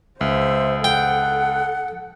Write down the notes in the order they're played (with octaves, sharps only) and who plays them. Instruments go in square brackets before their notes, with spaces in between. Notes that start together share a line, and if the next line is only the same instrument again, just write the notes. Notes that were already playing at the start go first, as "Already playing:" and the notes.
[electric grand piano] C#2 [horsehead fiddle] C5 [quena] E5
[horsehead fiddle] A4 [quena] F#5 [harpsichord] G5